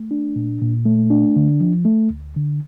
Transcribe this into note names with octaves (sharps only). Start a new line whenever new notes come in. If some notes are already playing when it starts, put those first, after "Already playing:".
Already playing: A3
D4
A#2
A#2
A3
D4
D3
F3
A3
D2
D3